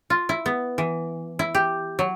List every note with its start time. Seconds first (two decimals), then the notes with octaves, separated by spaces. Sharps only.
0.10 F4
0.29 E4
0.46 B3
0.78 E3
1.39 E4
1.55 G4
1.99 F#3